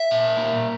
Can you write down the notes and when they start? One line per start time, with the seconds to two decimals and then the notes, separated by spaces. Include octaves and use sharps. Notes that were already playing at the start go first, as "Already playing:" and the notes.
Already playing: E5
0.11 A#2
0.37 A#3